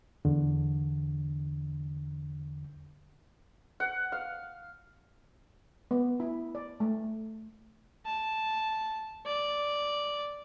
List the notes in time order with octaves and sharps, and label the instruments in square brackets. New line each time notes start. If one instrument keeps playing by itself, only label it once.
[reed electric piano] E2 D3
[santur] F#5
F5
[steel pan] B3
E4
D5
A3
[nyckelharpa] A5
D5